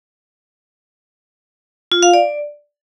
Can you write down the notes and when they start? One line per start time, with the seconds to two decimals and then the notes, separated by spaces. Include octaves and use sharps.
1.92 F4
2.03 F5
2.13 D5